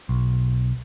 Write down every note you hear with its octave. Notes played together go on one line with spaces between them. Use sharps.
B1